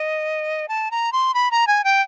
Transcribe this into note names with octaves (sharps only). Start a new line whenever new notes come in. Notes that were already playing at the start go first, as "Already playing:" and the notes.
Already playing: D#5
A5
A#5
C6
B5
A#5
G#5
G5